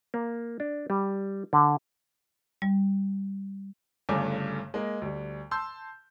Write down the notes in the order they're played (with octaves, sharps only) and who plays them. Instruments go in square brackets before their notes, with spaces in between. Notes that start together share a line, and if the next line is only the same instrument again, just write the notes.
[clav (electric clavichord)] A#3
D4
G3
D3
[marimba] G3
[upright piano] G1 G2 C#3 A3 G#5 D6
G#3 A#3
D2 G3
A5 C6 E6 G6